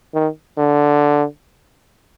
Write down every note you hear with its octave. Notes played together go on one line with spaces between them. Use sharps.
D#3
D3